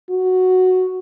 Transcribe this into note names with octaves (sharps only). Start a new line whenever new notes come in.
F#4